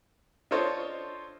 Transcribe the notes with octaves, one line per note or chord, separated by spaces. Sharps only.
D4 F4 A4 C5 C#5 D#5